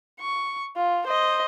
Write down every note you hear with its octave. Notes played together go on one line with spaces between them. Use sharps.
C#6
F4
C5 D#5